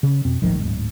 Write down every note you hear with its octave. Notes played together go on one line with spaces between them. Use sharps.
C#3
F2 B2 C4
D1 G#1 D#3 F3
D1 G#1 G#2